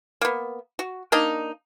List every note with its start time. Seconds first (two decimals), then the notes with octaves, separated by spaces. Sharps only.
0.21 A#3 B3
0.79 F#4
1.12 A#3 D4 D#4 D#5